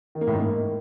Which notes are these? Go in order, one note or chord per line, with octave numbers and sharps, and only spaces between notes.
D#3
A#3
A2
G#2
A#3